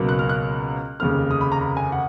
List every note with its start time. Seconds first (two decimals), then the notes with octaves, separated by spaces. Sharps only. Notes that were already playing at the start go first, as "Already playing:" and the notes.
Already playing: C#2 B2 F#3 A#3
0.09 F#6
0.19 F6
0.29 F#6
1.00 F1 D#2 C#3 F6
1.31 D#6
1.41 B5
1.52 A#5
1.61 B5
1.77 G#5
1.92 F#5